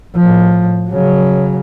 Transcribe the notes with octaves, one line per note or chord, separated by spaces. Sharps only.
A2 F3
C#3 F#3